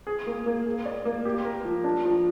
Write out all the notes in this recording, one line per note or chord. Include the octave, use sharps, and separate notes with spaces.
G#4
A#3
A#3
G#4
D5
A#3
G4
A#4
F3
D4
F3